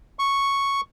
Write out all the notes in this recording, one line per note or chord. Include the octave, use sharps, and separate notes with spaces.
C#6